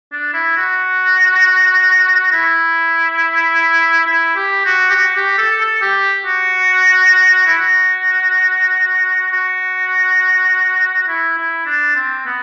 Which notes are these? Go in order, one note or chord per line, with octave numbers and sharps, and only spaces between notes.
D4
E4
F#4
E4
E4
G4
F#4
G4
F#4
G4
A4
A4
G4
F#4
E4
F#4
F#4
E4
E4
D4
C4
B3